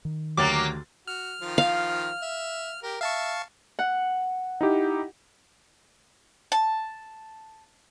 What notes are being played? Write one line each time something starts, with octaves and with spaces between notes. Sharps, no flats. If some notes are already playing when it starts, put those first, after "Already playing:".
D#3
D2 F#3 A#3 G4 D6 A6
F#4 F6
D#3 F3 F4
F5
E5
G4 A#4
E5 F5 A5 C#6
F#5
D#4 E4 G4
A5